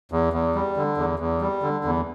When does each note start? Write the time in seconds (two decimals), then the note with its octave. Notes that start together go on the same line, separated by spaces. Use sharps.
0.12 E2
0.33 E2
0.55 G3
0.77 D3
0.98 E2
1.20 E2
1.41 G3
1.62 D3
1.85 E2